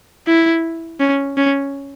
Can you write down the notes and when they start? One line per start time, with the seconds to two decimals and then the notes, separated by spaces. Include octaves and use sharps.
0.27 E4
1.00 C#4
1.37 C#4